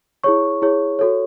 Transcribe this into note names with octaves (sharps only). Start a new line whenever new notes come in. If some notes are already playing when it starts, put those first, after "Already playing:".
E4 G#4 C#5 C#6
E4 G#4 C#5
F#4 A4 C#5